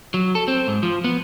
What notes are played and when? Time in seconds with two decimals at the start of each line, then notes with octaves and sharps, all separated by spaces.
0.14 F#3
0.35 A4
0.48 C4
0.68 G#2
0.83 F3
1.04 B3